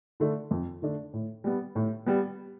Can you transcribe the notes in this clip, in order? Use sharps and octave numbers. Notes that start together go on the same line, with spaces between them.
D3 A3 D4
F2
D3 A3 D4
A2
G3 B3
A2
G3 B3